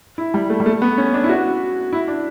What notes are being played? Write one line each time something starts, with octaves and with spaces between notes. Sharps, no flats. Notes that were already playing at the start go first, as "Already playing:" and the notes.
E4
G3
A3
G3
A3
B3
C#4
D4
E4
F#4
E4
D4